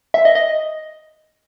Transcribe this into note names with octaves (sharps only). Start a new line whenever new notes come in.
E5
D#5
D#5